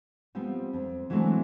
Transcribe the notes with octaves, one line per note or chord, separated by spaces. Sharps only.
F3 G3 B3 C4
F2
E3 F#3 G#3 A3 C4 D4